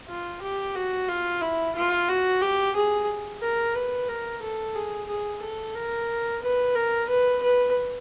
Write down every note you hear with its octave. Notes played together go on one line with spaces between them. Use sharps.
F4
G4
F#4
F4
E4
F4
F#4
G4
G#4
A#4
B4
A#4
A4
G#4
G#4
A4
A#4
B4
A#4
B4
B4